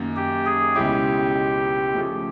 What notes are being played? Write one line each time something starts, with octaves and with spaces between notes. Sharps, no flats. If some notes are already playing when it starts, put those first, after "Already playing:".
Already playing: F#2 D#3 F#3 A#3
G4
G#4
C#2 B2 G#3 C#4 E4 G4
C#3 F3 A3